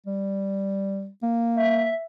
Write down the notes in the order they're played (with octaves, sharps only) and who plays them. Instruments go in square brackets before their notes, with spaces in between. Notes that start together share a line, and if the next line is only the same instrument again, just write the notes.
[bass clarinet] G3
A#3
[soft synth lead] E5